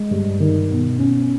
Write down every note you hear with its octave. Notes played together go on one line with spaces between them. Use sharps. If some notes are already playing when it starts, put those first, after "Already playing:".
Already playing: G#3
G2
D#3
B2
C#4